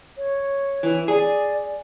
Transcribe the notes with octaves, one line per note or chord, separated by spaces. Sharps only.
C#5
E3
G#4 D5